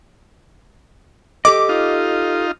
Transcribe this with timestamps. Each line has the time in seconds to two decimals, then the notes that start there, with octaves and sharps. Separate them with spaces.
1.45 G4 A4 D#5 D6
1.69 D#4 F4